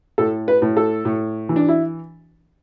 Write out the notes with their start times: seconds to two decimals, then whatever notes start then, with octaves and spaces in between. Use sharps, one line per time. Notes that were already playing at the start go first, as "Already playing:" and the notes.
0.18 A2 A4
0.48 B4
0.62 A2
0.77 A4
1.05 A2
1.49 E3
1.56 D4
1.69 E4